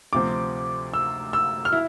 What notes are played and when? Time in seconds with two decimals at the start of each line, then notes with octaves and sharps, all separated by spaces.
0.13 D2 C3 F3 C4 D6
0.94 E6
1.33 E6
1.65 F6
1.72 E4